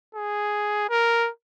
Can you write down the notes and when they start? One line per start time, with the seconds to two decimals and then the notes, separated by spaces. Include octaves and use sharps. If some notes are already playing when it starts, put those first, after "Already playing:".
0.15 G#4
0.90 A#4